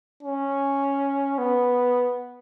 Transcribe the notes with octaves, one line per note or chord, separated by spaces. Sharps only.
C#4
B3